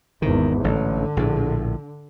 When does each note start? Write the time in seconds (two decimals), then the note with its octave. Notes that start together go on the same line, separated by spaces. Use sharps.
0.22 G#1 E2 D#3
0.64 A1 D3
1.17 A#1 A2